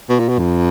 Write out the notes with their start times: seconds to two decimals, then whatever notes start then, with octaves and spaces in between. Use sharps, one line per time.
0.09 B2
0.19 A#2
0.29 B2
0.39 F2